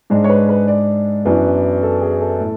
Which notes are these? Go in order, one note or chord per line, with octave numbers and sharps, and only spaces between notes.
G#2 G#3 D4
C#5
B4
B4
D5
F#2 E3 B3 D4
A4
G#4
A4
A2